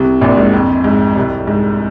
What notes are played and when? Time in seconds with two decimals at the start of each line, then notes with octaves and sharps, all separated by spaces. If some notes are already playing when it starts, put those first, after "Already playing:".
Already playing: C2 C3
0.21 A#1 A#2
0.37 G#2
0.53 F2
0.84 G#2
1.16 C2 C3
1.47 G#2